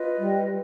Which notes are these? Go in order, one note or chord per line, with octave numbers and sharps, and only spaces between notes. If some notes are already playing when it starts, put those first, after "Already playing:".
Already playing: F4 B4 D#5
G3